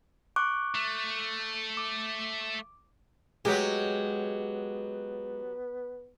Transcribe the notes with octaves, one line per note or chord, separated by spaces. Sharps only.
C#6 D6 F#6
A3
D6
F#3 G#3 B3 G4